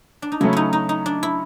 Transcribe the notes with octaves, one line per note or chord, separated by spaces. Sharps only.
D4
D#4
C#3 F#3 A3 C#4 E4
D#4 E4
D#4
D#4
D4
E4